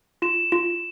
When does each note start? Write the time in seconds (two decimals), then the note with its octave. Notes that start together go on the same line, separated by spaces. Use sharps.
0.22 F4 E7
0.52 F4